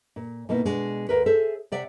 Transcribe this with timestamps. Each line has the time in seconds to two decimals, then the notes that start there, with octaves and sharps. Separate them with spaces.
0.16 A#2
0.49 B2 A#3 B3 D#4 E4
0.65 B2 G#3 D4
1.09 D2 A#4 B4
1.26 G#4 A4 C5 E5
1.72 C3 D5 E5 F#5